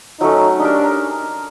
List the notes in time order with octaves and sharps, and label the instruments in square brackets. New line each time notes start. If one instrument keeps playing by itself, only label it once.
[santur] F#3 A3 C#4 [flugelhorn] D#4
[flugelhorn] D4 [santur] D#4 G4 A#4